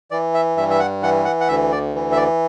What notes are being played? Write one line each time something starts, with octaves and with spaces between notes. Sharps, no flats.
E3 D5
E5
G2 E5
E5
F#5
E3 F#5
F#5
F#5
D2 E5
D5
E3
E5
D5